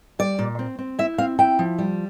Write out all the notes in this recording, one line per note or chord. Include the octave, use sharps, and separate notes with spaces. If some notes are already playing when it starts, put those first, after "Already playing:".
G3 D5
A#2
C4
C4
E4 E5
C4 F5
E4 G5
F3
G3